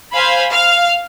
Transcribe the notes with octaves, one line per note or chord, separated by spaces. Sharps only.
C5 F5 G#5 B5
F5 F6